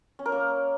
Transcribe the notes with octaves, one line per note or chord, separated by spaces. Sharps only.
C#4
A#4
A#3